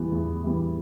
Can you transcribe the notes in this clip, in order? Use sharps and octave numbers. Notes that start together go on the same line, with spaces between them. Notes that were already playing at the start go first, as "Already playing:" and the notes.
Already playing: E2 E3 G3 B3
E2
E3 G3 B3